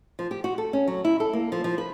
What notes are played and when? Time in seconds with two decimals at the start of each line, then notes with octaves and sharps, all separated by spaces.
0.19 F3
0.31 G4
0.44 F#4
0.58 A4
0.73 C#4
0.88 F#3
1.05 E4
1.20 A4
1.33 A#3
1.52 F3
1.64 F3
1.78 B4